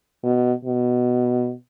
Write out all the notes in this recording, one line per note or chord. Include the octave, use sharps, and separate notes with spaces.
B2
B2